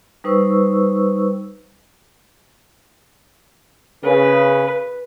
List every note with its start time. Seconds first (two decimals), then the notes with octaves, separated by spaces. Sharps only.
0.24 G3 D#4 B4 C5 C#6 E6
4.04 C#3 B4